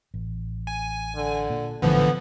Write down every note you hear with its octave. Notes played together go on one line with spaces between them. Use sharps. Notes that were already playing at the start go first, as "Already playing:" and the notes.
A1
G#5
D3
A#2
A#1 A2 D3 E3 F3 B3